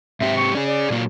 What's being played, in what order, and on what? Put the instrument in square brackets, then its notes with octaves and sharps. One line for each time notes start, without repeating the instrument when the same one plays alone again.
[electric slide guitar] G#2 C4 G4 [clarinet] E5
[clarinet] C#6
[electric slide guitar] C#4 G#4 [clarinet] D5
[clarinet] D5
[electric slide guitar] A#2 F#3 A#3